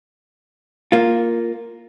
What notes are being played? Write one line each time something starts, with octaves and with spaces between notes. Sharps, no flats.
A#3 F4